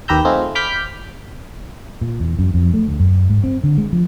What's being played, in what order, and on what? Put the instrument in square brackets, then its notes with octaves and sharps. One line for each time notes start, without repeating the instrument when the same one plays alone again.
[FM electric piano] D#2 G4 B4 A#5 E6 G6
A3 C4 D#4 F4 G#4
B5 D6 F6 G6 B6
[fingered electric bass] A#2
E2
F#2
F2
A3
D2
F#2
G#2
C4
D3
G#3
F3